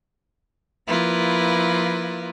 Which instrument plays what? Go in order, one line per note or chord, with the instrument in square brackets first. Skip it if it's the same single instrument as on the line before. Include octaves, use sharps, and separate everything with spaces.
[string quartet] F3 A#3 E4 F4 B4